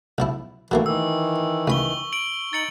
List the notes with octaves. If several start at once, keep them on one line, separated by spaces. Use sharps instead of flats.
B1 F3 E4
D#3 E3 F#3 A3 A#3
D#3 E3 E6
C#2 B5 C#6 G7
D7 F#7
D#4 A6 C#7 F#7